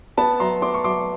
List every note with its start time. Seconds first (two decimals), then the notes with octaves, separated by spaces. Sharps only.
0.17 B3 A5 B5
0.40 F#3 A#5 C6
0.62 B3 C6 D6
0.74 C#6
0.84 F#3 C6 D6